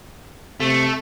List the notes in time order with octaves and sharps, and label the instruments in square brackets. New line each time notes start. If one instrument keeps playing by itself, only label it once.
[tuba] C3 [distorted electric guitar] A3